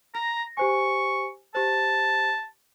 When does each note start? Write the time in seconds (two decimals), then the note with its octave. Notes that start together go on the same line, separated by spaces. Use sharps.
0.15 A#5 A#6
0.57 G4 C5 G#5 C#6
1.55 G4 C5 A5